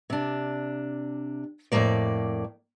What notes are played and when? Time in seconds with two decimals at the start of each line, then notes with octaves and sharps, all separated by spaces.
0.10 C3 D4
1.72 F2 A2 C3 E3 A#3 D5